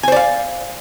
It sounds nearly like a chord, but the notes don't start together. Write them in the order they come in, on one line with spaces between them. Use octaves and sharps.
G#5 C5 D5 F5